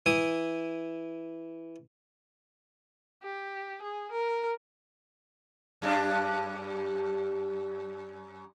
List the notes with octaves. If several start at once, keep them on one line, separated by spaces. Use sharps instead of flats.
E3 E4 D#6
G4
G#4
A#4
F#2 G3 D4